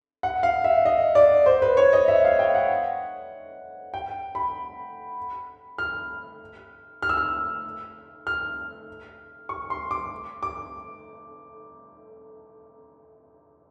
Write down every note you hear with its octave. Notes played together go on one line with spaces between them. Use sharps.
F#5
F5
E5
D#5
D5
C5
B4
C#5
D#5
E5
F5
G5
F#5
G5
B5
F6
F6
E6
F6
F6
C#6
C6
D6
D6